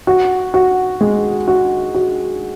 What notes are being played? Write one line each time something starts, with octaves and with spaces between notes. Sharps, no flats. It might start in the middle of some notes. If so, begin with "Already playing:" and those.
F#4
F#4
G#3
F#4
F#4